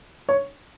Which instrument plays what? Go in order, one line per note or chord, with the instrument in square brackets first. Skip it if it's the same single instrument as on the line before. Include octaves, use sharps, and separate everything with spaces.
[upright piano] C#5